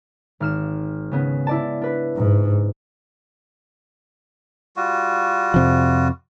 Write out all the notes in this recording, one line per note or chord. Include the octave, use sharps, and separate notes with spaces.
G#1 F6 E7
C#3 B3 C#4
E4 D5 A5
D4 B4
G#2
G3 F4 F#4
F2 C3 F3